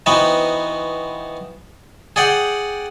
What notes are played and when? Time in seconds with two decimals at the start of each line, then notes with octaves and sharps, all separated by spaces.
0.06 E3 B3 C4 D#4 F#4
2.16 G#4 D5 F#5 G5